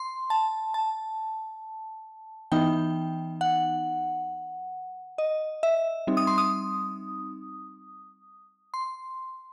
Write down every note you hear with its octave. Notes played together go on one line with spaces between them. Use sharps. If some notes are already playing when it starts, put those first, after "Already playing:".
Already playing: C6
A5
A5
E3 B3 D#4 G5
F#5
D#5
E5
G3 C4 D#4
D#6
C6
D#6
C6